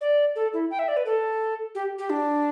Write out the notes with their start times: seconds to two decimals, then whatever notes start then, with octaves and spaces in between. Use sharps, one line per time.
0.01 D5
0.36 A4
0.53 E4
0.71 G5
0.79 E5
0.88 D5
0.97 B4
1.05 A4
1.75 G4
1.99 G4
2.10 D4